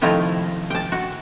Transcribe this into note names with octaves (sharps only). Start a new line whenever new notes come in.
C3 D#3 F3 A3 E4 A#5
G5 A5
F#4